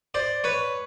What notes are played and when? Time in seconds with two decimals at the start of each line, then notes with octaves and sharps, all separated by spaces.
0.14 C5 D5
0.44 B4 C#5